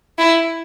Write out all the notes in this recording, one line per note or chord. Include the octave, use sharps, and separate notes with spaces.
E4